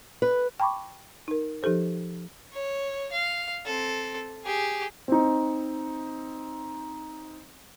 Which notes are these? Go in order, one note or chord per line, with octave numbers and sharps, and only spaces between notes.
B4
G5 A5 B5 C#6 D6
D#4 A#4
F3 D#4 G4 A4 C5
C#5
F5
C4 A4
G4 G#4
C4 D#4